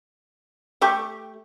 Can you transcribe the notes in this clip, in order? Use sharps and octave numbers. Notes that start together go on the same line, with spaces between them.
A3 G4 C#6